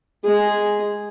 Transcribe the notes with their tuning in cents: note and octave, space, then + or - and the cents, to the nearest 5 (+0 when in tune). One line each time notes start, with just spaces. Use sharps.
G#3 +0 G#4 -5